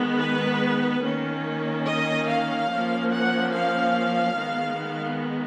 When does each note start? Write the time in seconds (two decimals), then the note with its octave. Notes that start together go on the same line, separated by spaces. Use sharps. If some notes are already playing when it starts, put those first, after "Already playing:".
Already playing: D#3 G#3 B3
0.19 B4
1.03 D#3 A#3 C#4
1.86 D#5
2.28 F5
2.70 F3 A#3 C#4
3.11 F#5
3.53 F5
4.36 D#3 G#3 B3